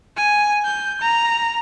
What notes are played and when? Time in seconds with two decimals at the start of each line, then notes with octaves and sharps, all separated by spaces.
0.17 G#5
0.65 G6
1.01 A#5